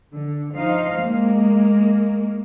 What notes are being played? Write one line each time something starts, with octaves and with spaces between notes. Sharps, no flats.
D3
F3 D#4 C5 F5
G#3 A#3